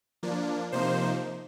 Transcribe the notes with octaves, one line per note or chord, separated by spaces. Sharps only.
F3 A#3 D4
C3 F3 A#3 D#4 C5